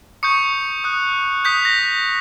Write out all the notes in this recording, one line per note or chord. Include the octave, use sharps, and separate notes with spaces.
C#6 D#6 G6 C#7
D#6 F#6
D#6 G6 B6
A#6